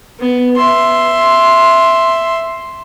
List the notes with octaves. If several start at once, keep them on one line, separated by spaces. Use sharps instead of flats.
B3
E5 C6